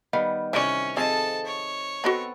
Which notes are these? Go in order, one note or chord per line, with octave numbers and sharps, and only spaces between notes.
D#3 G3 B3 F5
C3 E3 C#4 D5
F3 C4 G#4 A4 D#5 F5 A5
C#5
B3 C4 F#4 A4 D#5 B5